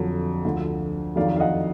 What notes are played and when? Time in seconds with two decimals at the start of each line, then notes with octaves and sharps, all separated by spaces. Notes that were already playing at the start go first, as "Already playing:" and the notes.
Already playing: F2 D3 F#3
0.45 D2 D3 F3
1.16 F2 D#3 F#3 D5 F5
1.36 F5
1.40 D#5 F#5